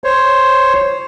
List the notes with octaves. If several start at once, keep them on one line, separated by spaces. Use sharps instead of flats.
C5 C#5